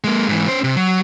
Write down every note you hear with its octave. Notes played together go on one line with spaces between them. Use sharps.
G#3 A#3
G#2 E3
C#4 C5
C3
F#3